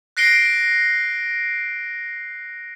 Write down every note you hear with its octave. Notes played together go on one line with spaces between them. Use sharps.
F#6 A#6 C7 D7 G7